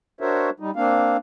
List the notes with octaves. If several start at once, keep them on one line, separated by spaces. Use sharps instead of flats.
D4 F#4 A#4 C5 C#5 E5
G3 D#4
A#3 C4 D4 F5